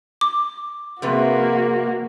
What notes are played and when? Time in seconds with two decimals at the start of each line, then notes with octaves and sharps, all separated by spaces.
0.21 D6
1.02 F2 C3 A#3 F#4 G#4 A#4 B4